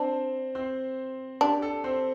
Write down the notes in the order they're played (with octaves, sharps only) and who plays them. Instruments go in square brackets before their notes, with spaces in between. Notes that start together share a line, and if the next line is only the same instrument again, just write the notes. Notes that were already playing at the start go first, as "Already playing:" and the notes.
Already playing: [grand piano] C4 C5 [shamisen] D4
[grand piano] C4 C5
[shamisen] D4 [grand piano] G4
[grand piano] A4
C4 C5